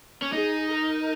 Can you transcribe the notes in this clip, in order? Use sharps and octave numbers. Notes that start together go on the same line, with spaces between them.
C#4
D#4 G#4
A#4